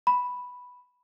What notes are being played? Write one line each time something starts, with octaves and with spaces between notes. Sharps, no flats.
B5